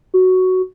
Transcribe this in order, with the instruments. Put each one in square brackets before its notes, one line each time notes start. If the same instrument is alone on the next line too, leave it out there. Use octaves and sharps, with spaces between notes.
[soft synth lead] F#4